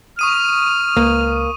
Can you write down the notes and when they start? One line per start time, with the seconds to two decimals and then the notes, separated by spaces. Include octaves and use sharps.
0.19 C#6 D#6 F6 D#7
0.97 C#2 A#3